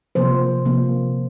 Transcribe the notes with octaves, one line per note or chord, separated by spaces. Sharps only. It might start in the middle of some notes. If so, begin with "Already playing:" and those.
C3 F3 A#3 C5
C3 F3 A#3